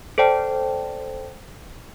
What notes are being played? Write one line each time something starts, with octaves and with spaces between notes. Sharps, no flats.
A4 C5 D5 G5 A5